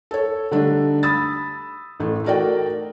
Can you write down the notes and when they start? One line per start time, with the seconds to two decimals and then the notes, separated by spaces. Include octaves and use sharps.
0.11 A4 C#5
0.51 D3 G3 A3 D4 D#4
1.03 B5 D#6 E6 A6
2.00 A1 A3
2.24 A3 D#4 F#4 A#4 D5 G5